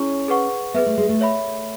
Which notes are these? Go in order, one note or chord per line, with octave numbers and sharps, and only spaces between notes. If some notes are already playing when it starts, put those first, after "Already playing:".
Already playing: C#4 E4 G#4 C#5 G#5 C#6
G#4 B4 F#5 C#6
B3 G#4 B4 E5
A3
G#3
A3
C#5 E5 B5